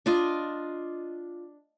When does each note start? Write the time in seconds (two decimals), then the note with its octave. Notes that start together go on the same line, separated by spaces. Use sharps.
0.06 D4 F4 D#5